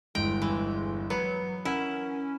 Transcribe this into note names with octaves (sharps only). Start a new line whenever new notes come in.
G1 E2 G#3 G5
E3
F#3 B3 B4
C#4 E4 A#4 F#5